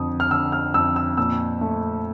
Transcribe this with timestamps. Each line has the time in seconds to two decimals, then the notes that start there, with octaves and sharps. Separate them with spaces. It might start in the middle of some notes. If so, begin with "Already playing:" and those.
Already playing: F2 D3 D#6
0.20 F6
0.31 D3 E6
0.52 F6
0.74 F2 E6
0.96 E6
1.17 A#2 E6
1.61 A3